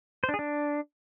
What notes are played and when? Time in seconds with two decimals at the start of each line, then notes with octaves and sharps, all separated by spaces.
0.24 C5
0.29 D4
0.34 G#4
0.39 D4